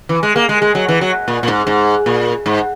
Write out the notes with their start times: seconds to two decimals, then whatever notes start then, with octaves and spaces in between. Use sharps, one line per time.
0.09 E3
0.23 G#3
0.36 A#3
0.49 G#3
0.62 G#3
0.75 F#3
0.88 E3
1.01 F#3
1.28 A#2
1.43 A#2
1.48 G#2
1.67 G#2
2.06 A#2
2.46 G#2